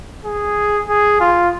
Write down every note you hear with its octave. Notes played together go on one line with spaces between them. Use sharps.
G#4
G#4
F4